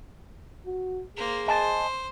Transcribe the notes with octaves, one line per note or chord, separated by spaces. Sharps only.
F#4
A#3 G#4 C5
C5 D#5 G#5 A5